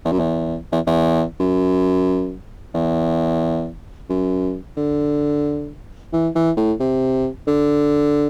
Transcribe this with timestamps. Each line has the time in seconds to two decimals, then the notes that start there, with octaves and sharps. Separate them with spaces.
0.05 E2
0.12 F#2
0.20 E2
0.72 E2
0.87 E2
1.40 F#2
2.75 E2
4.10 F#2
4.77 D3
6.13 E3
6.36 E3
6.57 A2
6.80 C3
7.47 D3